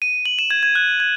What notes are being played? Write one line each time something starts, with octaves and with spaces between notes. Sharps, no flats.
D#7
F#7
E7
G#6
G#6
F#6
G#6